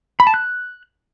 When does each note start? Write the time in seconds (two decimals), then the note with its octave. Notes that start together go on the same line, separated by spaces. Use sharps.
0.20 B5
0.27 A5
0.34 F#6